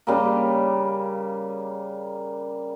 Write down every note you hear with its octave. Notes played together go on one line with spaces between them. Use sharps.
C#3 G3 A#3